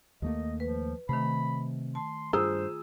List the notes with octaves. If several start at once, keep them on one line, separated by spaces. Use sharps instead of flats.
D#2 A3 A#3 D#5
F3 B4
C3 D#3 A3 B5
A5 C6
G2 F4 G#4 C5 A#5 D#6 E6